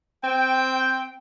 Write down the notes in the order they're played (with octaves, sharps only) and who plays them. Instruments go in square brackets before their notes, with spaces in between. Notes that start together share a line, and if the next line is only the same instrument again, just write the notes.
[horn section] C4 G5